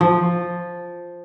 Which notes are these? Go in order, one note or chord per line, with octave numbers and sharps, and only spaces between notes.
F3